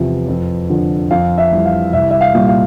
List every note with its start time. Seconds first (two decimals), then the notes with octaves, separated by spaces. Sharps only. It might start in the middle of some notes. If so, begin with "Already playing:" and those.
Already playing: E2 C3 F3
0.28 F2
0.69 D3 F3
1.11 F2 F5
1.38 E5
1.52 E3 G3
1.66 F5
1.93 C2 E5
2.10 E5
2.21 F5
2.34 A#2 G3
2.48 F5